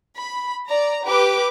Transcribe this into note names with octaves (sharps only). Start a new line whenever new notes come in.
B5
D5 A#5
G4 B4 D6